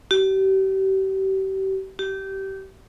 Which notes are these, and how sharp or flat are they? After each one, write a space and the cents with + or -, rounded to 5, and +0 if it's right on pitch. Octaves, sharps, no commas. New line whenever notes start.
G4 -35
G4 -20